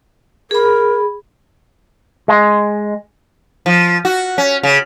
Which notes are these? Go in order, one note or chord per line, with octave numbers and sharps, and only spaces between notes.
G#4 A#4 B5
G#3
F3
F#4
C#4
C#3